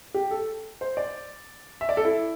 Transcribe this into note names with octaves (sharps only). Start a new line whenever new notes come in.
G4
A4
C5
D5
E5
D5
A4
E4